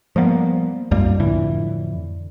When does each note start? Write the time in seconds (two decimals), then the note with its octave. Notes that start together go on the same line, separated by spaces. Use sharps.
0.16 F3 G3 A#3 B3
0.91 C2 F#2 G3 A#3
1.20 F2 A2 D3 E3